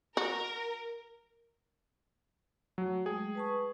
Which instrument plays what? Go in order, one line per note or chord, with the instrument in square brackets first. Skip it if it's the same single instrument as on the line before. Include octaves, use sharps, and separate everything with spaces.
[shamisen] F#4 [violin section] A#4
[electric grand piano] F#3 [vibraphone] A3
[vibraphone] G#3 A3 G5 [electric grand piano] G#4
[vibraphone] B4 A5 C#6